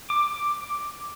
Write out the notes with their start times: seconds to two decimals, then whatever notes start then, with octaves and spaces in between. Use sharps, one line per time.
0.10 D6